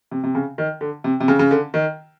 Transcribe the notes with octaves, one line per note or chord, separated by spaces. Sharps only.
C3
C3
C#3
D#3
D3
C3
C3
C#3
C#3
D3
D#3